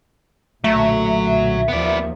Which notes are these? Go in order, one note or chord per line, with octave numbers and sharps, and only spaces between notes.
B1 A#2 D3 F#3 A3 E5
D#2 D#3 F3 B3 D5